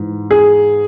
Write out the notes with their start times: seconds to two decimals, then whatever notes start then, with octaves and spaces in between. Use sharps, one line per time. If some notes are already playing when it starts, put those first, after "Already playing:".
Already playing: G#2 E3
0.31 G#4